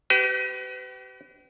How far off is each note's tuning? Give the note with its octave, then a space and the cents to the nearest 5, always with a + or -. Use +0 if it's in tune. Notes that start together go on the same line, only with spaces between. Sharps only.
G4 -40 B4 +35